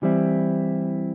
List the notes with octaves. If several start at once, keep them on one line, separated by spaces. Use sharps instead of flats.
E3 G3 C4 E4